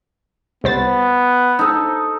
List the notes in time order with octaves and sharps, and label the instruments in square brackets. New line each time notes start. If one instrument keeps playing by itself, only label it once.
[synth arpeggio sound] C2 C5 A6 [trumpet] B3
[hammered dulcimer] D#4 A4